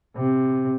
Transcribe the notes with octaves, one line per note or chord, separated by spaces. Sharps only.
C3